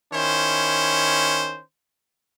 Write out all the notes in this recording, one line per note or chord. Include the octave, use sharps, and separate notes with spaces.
D#3 C#4 E4 C5